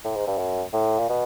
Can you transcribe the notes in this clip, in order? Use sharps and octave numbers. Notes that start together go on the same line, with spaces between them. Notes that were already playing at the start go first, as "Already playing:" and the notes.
A2
G#2
G2
F#2
A2
A#2
B2